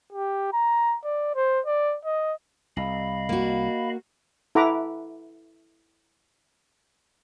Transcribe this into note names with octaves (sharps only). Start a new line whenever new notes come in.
G4
A#5
D5
C5
D5
D#5
C2 D#5 F5 B5
A#3 F#4
E4 A4 F#5 A#5 B5 D6